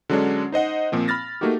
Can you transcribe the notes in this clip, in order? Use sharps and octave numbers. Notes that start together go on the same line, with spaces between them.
D3 F#3 G#3 C#4 D4
D#4 C5 D#5 F#5
A#2 F3 C4
B5 F6 A6 A#6
A3 A#3 D#4 F#4 G4